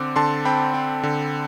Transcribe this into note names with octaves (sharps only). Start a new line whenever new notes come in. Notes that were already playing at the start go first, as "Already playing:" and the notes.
Already playing: D3 C4 D6
D3 A5 C6
C4 G5 B5
C4
D3